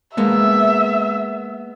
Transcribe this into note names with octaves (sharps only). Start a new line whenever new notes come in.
G#3 A#3 B3 E5